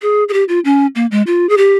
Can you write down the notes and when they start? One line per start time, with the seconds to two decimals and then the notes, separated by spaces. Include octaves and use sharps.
0.02 G#4
0.29 G#4
0.33 G4
0.49 F4
0.65 C#4
0.95 A#3
1.11 G#3
1.27 F4
1.49 G#4
1.57 G4